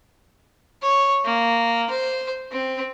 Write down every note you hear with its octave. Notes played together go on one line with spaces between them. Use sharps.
C#5
A#3
C5
C4